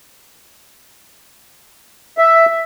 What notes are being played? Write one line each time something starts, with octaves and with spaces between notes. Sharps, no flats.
E5